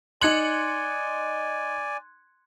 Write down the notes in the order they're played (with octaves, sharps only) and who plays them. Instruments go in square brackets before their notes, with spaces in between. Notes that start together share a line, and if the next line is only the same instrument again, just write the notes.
[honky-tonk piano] D#4 C#7 F#7 [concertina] D5 G#5 [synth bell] C6 F#6 G#6